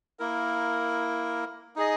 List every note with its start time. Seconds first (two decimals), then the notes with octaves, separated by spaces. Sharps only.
0.19 A#3 E4 A#4
1.76 D#4 G#4 D#5